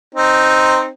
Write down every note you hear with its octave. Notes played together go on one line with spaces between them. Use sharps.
C4 D#4